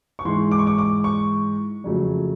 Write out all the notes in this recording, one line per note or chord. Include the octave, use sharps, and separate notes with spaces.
C#6
G#2 E3 G#3 C6
D6
C#6
D6
D6
C#6
F2 C#3 F#3 A3